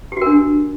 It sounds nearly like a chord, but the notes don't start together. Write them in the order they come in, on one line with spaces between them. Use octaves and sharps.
G4 F#4 A#4 D4